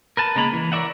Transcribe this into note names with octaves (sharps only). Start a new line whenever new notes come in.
A#4 B4 A5
C#3 G#3 A#3 A#5 B5
E3
A#4 C#5 D5 E5 F#5